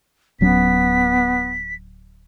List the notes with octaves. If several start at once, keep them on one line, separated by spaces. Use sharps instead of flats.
D1 F#3 B3 C#4 B6